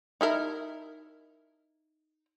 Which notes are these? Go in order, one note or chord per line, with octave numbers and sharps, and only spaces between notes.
D#4 E4 A#4